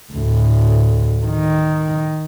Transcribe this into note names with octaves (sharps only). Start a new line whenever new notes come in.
D2 A2
D#3